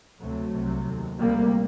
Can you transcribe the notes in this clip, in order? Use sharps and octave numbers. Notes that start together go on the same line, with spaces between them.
D2 C3 F#3 A3
C2 C3
D#2
D2 C3 G3 A#3